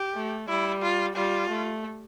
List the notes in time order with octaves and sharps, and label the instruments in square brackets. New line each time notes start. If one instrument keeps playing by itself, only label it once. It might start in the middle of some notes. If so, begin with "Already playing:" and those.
Already playing: [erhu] G4
[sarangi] A3
[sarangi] G3 [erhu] E4
[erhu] F4
[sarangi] G3 [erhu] F4
[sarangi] A3